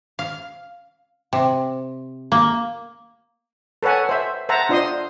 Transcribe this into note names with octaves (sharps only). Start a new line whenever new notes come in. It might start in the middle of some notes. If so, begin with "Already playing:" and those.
F5
C3
A#3
A4 B4 C#5 F#5 G#5
C5 E5
C5 E5 F#5 A5 A#5
D4 F4 C5 D#5 C6 D#6